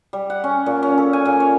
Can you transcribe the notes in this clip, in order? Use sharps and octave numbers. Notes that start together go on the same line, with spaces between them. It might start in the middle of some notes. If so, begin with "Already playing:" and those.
G3
F#5
C#4
A#2
C#4
A4
G#5
A#2
C#5